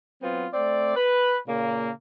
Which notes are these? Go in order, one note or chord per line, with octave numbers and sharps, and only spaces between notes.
F#3 B3 C4 F4
A3 C4 D5
B4
A#2 C#3 A#3